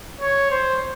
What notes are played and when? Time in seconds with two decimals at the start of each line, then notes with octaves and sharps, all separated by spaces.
0.20 C#5
0.51 C5